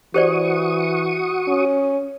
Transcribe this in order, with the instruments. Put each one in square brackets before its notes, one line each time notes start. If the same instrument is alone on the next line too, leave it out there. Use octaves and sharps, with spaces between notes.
[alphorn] E3 [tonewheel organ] F#4 C#6 D#6 [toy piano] G4 C5 D5
[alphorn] C#4